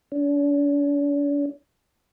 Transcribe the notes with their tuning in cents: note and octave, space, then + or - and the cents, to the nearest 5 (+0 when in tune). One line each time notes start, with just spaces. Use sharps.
D4 -45